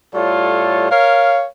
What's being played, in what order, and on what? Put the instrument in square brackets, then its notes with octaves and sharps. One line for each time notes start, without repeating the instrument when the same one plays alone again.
[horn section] A2 G3 F4 A4 C#5
A#4 C#5 F5